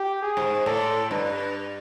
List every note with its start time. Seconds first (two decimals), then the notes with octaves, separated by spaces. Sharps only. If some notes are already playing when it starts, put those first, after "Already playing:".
Already playing: G4
0.22 G#4
0.37 G#2
0.66 A2 A4
1.11 G2 B4